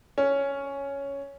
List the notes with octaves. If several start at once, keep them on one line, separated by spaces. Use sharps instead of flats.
C#4